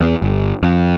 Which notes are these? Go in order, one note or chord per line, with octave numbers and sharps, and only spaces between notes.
E2
G1
F2